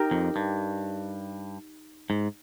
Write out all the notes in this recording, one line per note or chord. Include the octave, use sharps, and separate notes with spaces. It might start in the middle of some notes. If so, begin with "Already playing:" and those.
Already playing: D#4 G4 A#4
F2
G2
G#2